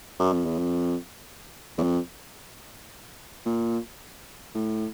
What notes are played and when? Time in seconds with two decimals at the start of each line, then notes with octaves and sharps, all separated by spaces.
0.20 F#2
0.33 F2
0.45 E2
0.59 F2
1.78 E2
1.83 F2
3.46 A#2
4.55 A2